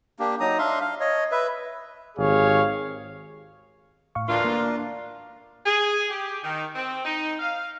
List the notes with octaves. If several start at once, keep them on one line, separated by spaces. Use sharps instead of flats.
A#3 D4 G4
F#3 D#4 A#5 D#6
D4 E5 F5 C6
F5
C#5 D#5
B4 E5
G#1 G4 G#4 C#5 F5
A2 F5 C#6
D2 E3 D4 F4 A#4
A#3
G#4
G4
D#3
C4
D#4
F5